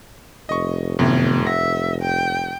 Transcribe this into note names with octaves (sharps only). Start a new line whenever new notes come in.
F1 D#5 C#6
F#2 A2 C3 D#3 B3
E5 F#5 A#6
G5